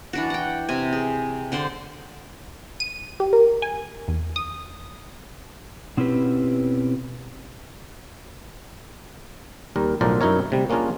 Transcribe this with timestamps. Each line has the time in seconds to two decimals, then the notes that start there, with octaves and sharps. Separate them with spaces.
0.13 E3 D4 F#4
0.30 F#5 G5
0.69 C3 G#5
0.93 G#4
1.52 D3 C5 D5 C6
2.80 D#7
3.20 G4
3.33 A#4
3.62 G#5
4.08 E2
4.36 D#6
5.97 B2 C4 C#4 E4 G4 B4
9.76 D#2 G3 A#4
10.01 B1 A2 F3 A#4 C5 D5
10.21 F#2 D#4 E4 A#4 C#5
10.50 D2 C3 G3
10.70 A#3 C#4 D4 F4 G#4 A#4